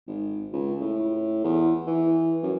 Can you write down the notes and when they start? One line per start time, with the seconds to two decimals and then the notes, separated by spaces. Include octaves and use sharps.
0.08 G#1
0.53 C#2
0.81 A2
1.44 E2
1.87 E3
2.43 F#2